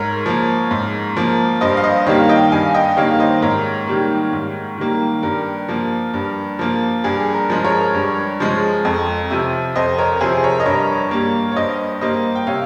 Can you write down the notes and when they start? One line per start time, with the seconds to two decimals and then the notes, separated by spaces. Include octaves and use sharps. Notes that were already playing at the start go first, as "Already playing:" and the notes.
Already playing: G#2 A#4 C#5
0.26 F3 A#3
0.71 G#2
1.17 F3 A#3
1.61 G2 C5 D#5
1.77 F5
1.84 C5 D#5
2.07 D#3 G3 A#3 C#5 F5
2.29 D#5 G5
2.52 G2 F5 G#5
2.74 D#5 G5
2.97 D#3 G3 A#3 C#5 F5
3.20 C5 D#5
3.42 G#2 A#4 C#5
3.87 D#3 G3 A#3
4.33 G#2
4.78 D#3 G3 A#3
5.23 G2 A#4
5.68 F3 A#3
6.14 G2
6.59 F3 A#3
7.04 G2 G#4
7.34 A#4
7.50 F3 G#3
7.65 A#4 C#5
7.94 G2
8.40 F3 G#3
8.85 F2
9.30 C3 F3
9.76 F2 C5 D#5
9.98 A#4 C#5
10.21 C3 F3 G#4 C5
10.44 A#4 C#5
10.60 D#5
10.66 G2 A#4 C#5
11.11 G3 A#3
11.52 C#5
11.56 G2 C5 D#5
12.01 G3 A#3 C5 D#5
12.35 G5
12.47 C3 C#5 F5